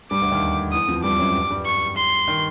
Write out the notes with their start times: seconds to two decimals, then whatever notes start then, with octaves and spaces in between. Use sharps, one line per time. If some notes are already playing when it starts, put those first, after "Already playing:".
0.11 G2 G3 D6
0.21 D2 D3
0.31 D#2 D#3
0.72 E2 E3 D#6
0.88 F2 F3
1.03 G2 G3 D6
1.19 F#2 F#3
1.35 G2 G3
1.50 G2 G3
1.66 C#6
1.97 C6
2.28 D#3